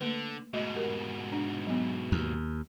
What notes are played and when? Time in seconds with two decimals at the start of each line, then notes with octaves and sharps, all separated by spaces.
0.01 D3 A3 A#3 B4
0.53 G#2 B2 A3 F#4 D#5
0.76 G4 A#4
1.32 D4
1.67 F#3 B3
2.12 D#2